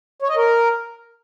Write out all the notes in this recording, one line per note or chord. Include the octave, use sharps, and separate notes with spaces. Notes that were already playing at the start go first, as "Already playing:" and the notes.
C#5
D#5
A#4